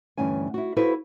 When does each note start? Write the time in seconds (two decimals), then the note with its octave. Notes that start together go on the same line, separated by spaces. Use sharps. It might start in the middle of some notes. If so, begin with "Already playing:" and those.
0.17 D2 G2 E3 C#4 G#5
0.54 E4 F#4
0.77 E4 F#4 A4 B4 C5 F5